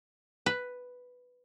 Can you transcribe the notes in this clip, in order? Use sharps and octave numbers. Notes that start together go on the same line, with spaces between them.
B4